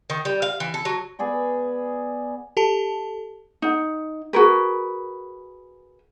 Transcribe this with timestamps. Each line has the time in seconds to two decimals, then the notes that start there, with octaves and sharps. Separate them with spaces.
0.10 D#3
0.25 G3
0.42 F5
0.60 E3
0.74 A4
0.85 F#3
1.19 B3 G#4 D5 B5
2.57 G4 A4 A5
3.62 D#4 F#5
4.33 F#4 G#4 A#4 B4